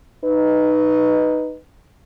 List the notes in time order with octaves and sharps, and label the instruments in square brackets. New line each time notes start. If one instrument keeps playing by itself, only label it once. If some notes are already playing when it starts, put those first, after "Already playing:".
[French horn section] D#4 B4